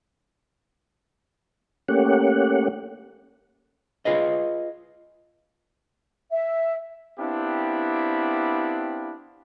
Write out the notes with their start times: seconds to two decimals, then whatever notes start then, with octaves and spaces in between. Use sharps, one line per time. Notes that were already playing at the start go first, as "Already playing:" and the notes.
1.88 A3 A#3 C#4 G4 F#5
4.05 F4 G#4 B4 D#5
6.30 E5
7.19 B3 C4 D4 E4 G4 F5